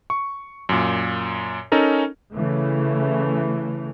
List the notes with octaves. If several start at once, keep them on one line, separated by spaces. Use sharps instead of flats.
C#6
F#2 A#2
C#4 D#4 A4 A#4
C#3 E3 A3